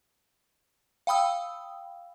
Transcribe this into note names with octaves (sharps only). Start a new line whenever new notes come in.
F5 G5 B5 D#6 E6